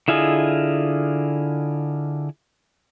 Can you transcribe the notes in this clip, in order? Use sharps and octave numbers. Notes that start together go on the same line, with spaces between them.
D3 E4 F4 G#4 D#5